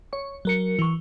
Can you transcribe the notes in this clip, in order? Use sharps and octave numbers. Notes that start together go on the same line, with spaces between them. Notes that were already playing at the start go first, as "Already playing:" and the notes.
C#5 C#6
F#3 A#4 C#7
E3 C#6